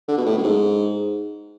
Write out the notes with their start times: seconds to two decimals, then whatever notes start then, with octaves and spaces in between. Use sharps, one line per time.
0.08 D3
0.17 B2
0.26 A2
0.38 F#2
0.44 G#2